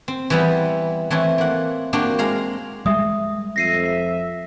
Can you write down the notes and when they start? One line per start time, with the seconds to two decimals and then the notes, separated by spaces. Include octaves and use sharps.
0.08 C4
0.30 E3 G3 B3
1.11 E3 A3 C4 C#5
1.38 A#3 F#5
1.93 A#3 C4 D4 F#4 G4
2.19 G#3 F5 A#5
2.86 G3 G#3 E5 D#6
3.56 F2 E5 A#6 C7 D#7